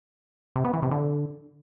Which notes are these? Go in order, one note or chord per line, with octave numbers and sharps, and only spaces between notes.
C3
B3
E3
C3
D3